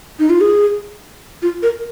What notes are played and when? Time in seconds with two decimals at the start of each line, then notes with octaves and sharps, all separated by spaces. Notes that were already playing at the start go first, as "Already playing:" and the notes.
0.19 D#4
0.30 F4
0.41 G#4
1.42 F4
1.63 A#4